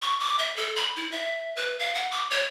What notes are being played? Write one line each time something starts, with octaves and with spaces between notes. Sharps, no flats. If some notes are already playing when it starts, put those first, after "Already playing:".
C#6
D6
E5
A4
B5
E4
E5
B4
F5
F#5
D6
C#5